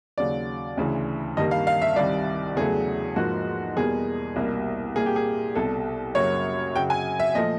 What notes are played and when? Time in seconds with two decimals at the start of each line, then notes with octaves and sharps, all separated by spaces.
0.18 D#2 C#3 F#3 D5
0.77 D2 C#3 E3
1.37 G2 D#3 G3 A#3 D#5
1.51 F5
1.67 F5
1.82 E5
1.96 C2 C3 D#3 G3 D5
2.56 E2 C#3 F#3 A3 G#4
3.16 G#2 F3 A#3 F#4
3.76 E2 B2 G3 A#3 G#4
4.36 C2 B2 G3 A#3
4.96 A#2 G3 A#3 G#4
5.06 G4
5.16 G#4
5.55 C2 B2 G3 A4
6.15 F#2 C#3 F#3 A#3 C#5
6.75 F#2 C#3 F#3 G5
6.90 G#5
7.20 E5
7.35 A#2 F3 A3 D#5